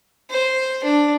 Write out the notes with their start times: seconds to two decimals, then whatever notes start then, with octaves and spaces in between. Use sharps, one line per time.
0.30 C5
0.84 D4